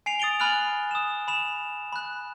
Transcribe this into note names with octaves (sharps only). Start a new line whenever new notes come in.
G#5 C7 D7 F7
D#6 A6 D7 F7 G7
G#5 B5 F6 F#6 D7 F7
D#6 E7
B5 E7 F7
B5 F#6